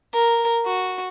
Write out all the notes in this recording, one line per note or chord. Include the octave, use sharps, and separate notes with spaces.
A#4
F#4